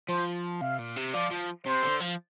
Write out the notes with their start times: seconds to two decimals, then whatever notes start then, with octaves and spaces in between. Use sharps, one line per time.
0.09 F3 C5
0.61 C3 F5
0.79 A#2
0.96 C3
1.13 F3 D5
1.31 F3
1.65 C3 C5
1.83 D3
2.00 F3